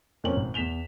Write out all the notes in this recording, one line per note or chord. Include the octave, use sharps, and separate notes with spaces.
F2 A#3 C4 C#4 F#7
G#1
E2 B6 E7 F7 G7